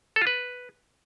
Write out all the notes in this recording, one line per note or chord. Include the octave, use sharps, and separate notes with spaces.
A4
F4
B4